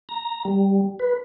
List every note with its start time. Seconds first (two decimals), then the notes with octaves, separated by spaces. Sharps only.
0.09 A#5
0.45 G3
0.99 B4